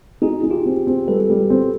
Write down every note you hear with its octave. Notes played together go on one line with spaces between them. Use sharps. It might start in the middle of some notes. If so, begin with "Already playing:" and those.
D#4 F#4 G#4
D#4
F4 G4
C4
C4
G3 A4 B4
G3
C4